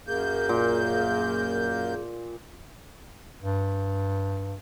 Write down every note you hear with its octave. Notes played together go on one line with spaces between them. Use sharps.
F#2 A#3 G#4 G6
A#2
G2